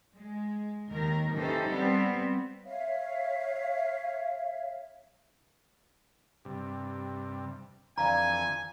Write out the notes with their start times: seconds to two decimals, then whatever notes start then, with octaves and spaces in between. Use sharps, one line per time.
0.16 G#3
0.90 D#2 D#3 A#4
1.36 E3 C#4 D#4 G4 A4 C5
1.70 G3 B3 C4
2.64 C#5 E5 F5
6.45 G2 C3
7.98 F2 D3 E3 D5 F5 G#5 A#5